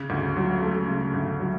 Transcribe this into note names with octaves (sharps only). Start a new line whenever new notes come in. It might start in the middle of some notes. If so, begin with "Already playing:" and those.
Already playing: C#3
D2
F#3
A3
C#3
D2
F#3